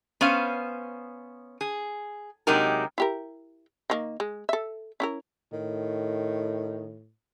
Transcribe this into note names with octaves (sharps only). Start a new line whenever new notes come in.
B3 C#4 C5 F5
G#4
C3 F#3 G#3 D#4 G4 A#4
E4 G4 A#4
D#3 F#3 A#3
G#3
A4 E5
C#4 E4 A#4
A2 D#3